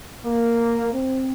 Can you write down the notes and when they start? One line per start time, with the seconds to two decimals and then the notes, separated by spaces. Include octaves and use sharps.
0.25 A#3
0.93 C4